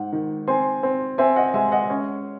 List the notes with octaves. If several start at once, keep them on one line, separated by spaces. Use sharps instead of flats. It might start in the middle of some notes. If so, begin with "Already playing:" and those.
Already playing: G#2 F#5
D#3
C4 G#5 C6
C4
C4 E5 G#5
D#5 F#5
G#3 E5 G#5
D#5 F#5
C#4